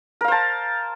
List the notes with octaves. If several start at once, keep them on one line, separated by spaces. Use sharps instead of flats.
A#4 C5 F5 A5